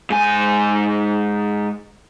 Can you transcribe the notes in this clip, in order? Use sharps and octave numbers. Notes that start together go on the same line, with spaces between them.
G#2 G#5